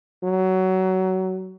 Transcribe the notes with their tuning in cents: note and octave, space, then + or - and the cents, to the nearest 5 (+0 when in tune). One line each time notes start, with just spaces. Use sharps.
F#3 +20